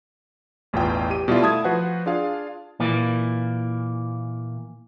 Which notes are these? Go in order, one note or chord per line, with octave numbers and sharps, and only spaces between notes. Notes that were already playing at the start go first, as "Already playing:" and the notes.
A1 E2 B2 B3 F4 G5
G4 D#7
B2 G3 E4 F4
A3 E4 A5 D#6 G#6
F3 F#4 B4 C5 F#5
D4 F4 G#4 F5
A#2 E3 A#3